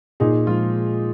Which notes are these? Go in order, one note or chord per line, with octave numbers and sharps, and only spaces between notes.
A#2 D#4 G#4
F3 G#3 F4